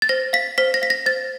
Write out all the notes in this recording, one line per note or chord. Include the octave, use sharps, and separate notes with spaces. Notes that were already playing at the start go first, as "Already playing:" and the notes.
A6
C5 A#6
F5 B6
C5 B6
A#6
F5 B6
A#6
C5 A6